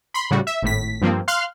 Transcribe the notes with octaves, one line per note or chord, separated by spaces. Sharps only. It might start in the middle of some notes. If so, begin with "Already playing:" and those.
B5 C6
A2 C#3 G3 F#4
E5
G#1 A2 B6
G2 F3 A#3 C4
F5 C6 F6 F#6